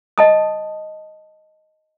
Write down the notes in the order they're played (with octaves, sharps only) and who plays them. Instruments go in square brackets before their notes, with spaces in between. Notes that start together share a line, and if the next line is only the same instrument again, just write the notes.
[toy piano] D#5 A5 D#6